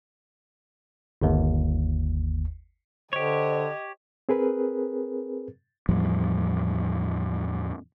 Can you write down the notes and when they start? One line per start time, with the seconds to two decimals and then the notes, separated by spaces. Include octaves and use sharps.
1.22 G1 D#2
3.13 D3 G4 C5 C#5 D#5
4.29 C4 G#4 A#4 B4
5.89 E2 A2 F3 G3